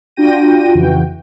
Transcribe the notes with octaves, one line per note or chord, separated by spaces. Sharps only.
D4 F4 F#4 G5 A#6 D#7
F2 C#3 E3 F#4 G5